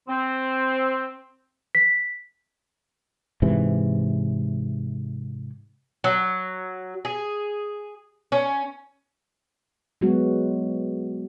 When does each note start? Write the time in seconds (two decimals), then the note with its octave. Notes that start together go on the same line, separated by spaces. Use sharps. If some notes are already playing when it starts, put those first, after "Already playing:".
0.09 C4
1.75 B6
3.42 G#2 C3 E3
6.04 F#3
7.05 G#4
8.32 C#4
10.01 F#3 G#3 B3 F#4